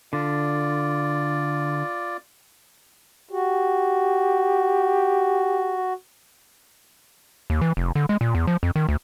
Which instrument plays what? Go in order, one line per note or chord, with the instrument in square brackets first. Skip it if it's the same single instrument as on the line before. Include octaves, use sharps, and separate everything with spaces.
[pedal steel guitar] D3 [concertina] F4 D5
[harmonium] F#4 [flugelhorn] G4
[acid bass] D#2
E3
F1
D3
G#3
A#2
E2
F3
F2
D#3
D2